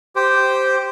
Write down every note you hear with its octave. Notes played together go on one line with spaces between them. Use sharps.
G4 C5 G5